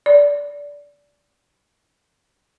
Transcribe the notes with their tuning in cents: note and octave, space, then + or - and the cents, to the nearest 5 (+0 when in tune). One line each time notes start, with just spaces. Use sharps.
D5 -20